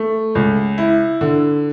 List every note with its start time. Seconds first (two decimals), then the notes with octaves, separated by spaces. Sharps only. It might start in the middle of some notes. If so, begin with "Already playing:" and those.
Already playing: A3
0.35 C#2
0.78 E4
1.21 D3